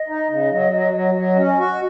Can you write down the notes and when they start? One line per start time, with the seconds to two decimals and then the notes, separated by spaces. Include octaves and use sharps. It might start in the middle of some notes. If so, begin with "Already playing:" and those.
Already playing: D#5
0.08 D#4
0.30 C#3
0.51 F#3
0.72 F#3
0.93 F#3
1.15 F#3 D#5
1.36 C#4
1.46 D#5
1.58 F#4